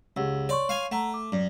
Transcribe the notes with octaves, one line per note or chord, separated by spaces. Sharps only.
C#2 G4 F#5 E6
C#5 D5 C6 C#6
F5 G#5
A3 F#5 A#5
D6
F#2 D5